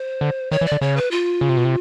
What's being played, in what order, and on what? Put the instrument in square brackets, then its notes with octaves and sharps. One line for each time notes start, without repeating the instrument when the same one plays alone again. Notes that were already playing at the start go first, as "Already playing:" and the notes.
Already playing: [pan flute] C5
[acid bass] D3
[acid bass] D#3 [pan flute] C#5
[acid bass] E3
[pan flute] D5
[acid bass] D3
[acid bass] C#3 [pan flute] C#5
[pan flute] B4
F4
[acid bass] C#3
C3
B2
C3